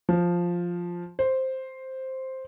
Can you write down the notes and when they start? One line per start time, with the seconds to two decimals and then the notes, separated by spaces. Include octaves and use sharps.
0.09 F3
1.19 C5